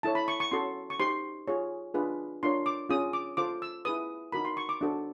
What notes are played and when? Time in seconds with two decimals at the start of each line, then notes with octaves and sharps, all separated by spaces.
0.03 E4 A4 C#5 A5
0.15 B5
0.28 C#6
0.40 C#6
0.51 C#4 F#4 A4 C6
0.90 C#6
0.99 D#4 G4 C5 C6
1.48 F4 G#4 C#5
1.94 D4 F4 G#4 B4
2.43 D4 F4 A#4 C#5 C6
2.66 D6
2.89 C#4 F4 G#4 D#6
3.13 D6
3.37 F4 A4 C5 D6
3.62 E6
3.85 E4 G#4 B4 D#6
4.32 D#4 F#4 A#4 B5
4.45 C6
4.57 C#6
4.69 D6
4.81 D4 F#4 A4 C5